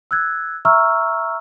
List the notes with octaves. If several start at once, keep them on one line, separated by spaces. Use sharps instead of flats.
E6 F#6 G#6
E5 A#5 C#6 E6 F6